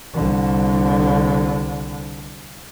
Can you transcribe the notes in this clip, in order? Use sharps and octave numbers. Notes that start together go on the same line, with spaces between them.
C2 D3